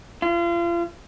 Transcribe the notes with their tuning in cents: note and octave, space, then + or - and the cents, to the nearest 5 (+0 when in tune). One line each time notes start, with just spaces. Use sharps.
F4 -35